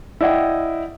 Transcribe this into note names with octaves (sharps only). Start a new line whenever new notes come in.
E4 D5 D#5 F#5 G5